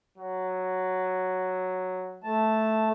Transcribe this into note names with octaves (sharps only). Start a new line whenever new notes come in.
F#3
A3 A5